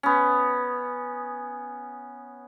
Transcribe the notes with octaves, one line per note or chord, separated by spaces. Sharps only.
B3 C#4